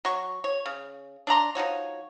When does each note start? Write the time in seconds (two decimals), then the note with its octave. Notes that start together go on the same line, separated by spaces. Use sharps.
0.05 F#3 C#6
0.44 C#5
0.66 C#3
1.27 D4 D5 A#5 C6
1.55 F3 D#4 F#4 C#5